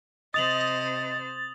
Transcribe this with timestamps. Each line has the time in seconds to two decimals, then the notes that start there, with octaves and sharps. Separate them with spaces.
0.34 C3 C5 D#5 D#6 A6 F7 F#7